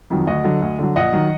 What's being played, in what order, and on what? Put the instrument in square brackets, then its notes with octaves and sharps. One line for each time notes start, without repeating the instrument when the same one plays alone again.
[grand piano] F2 D#3 F#3
D2 D#5 F#5
D3 F#3
D2
D3 F#3
A#1 D#5 F#5
D#3 F#3